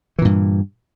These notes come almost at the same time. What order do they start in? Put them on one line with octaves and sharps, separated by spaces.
E3 A#2 G2